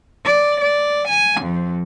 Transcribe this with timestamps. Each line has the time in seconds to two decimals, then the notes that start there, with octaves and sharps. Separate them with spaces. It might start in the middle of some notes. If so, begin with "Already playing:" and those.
0.24 D5
0.61 D5
1.08 G#5
1.41 F2